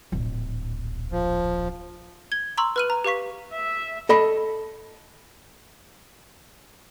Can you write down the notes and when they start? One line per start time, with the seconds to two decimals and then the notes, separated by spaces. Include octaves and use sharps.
0.12 D1 A#1
1.12 F3
2.32 G#6 G7
2.58 A#5 C6 C#6 E6 F#7
2.76 B4 B5 F6 F#6 D#7 F#7
2.90 A#5
3.04 G4 B4 F5 C#6 B6
3.53 E5
4.09 A4 D#5 B5